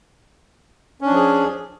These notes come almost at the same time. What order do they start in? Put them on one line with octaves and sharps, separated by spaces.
C#4 D4 F3 G#4